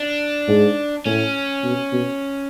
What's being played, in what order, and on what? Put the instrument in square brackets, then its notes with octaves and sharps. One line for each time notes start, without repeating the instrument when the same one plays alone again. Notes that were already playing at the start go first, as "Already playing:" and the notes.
Already playing: [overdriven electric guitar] D4
[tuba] G#2
[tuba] A2 [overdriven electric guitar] C#4
[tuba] B2
B2